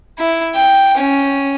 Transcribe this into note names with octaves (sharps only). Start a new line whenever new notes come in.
E4
G5
C#4